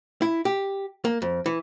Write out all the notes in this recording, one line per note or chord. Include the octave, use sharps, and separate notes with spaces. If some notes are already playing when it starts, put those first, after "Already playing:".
E4
G4
A#3
F2
E3